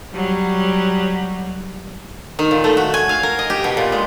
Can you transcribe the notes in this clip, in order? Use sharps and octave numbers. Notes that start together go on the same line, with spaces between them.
F#3 G3
D#3
A#2
A3
F#4
G#5
F5
A#4
D#5
G4
B2
A#2
G#3